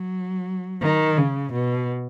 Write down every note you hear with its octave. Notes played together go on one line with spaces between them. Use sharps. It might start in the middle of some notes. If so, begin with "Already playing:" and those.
Already playing: F#3
D#3
C#3
B2